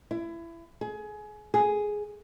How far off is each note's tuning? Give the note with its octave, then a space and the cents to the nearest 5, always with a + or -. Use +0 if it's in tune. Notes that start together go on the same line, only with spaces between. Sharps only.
E4 +25
G#4 +25
G#4 +5